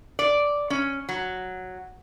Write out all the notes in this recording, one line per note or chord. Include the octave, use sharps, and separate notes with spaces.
D5
C#4
F#3